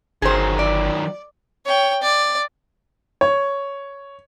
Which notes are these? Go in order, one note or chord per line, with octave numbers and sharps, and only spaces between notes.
G1 D#3 F#3 G#4 C5
D5
C#5 G5
D5
C#5